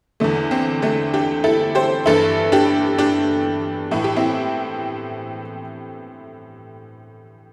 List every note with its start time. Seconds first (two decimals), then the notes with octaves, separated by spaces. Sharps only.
0.20 E2 D3 A3
0.51 C4
0.82 A3 D4
1.14 D4 G4
1.44 E4 A4
1.75 G4 C5
2.06 G2 E3 E4 A4
2.52 D4 G4
2.99 D4 G4
3.91 A2 E3 E4
4.04 G4
4.16 C4 E4